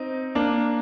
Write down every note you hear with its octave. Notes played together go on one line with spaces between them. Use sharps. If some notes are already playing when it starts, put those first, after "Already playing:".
Already playing: C4 D#4
A#3 D4